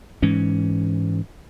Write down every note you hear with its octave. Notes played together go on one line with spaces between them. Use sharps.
G#2 E3 C#4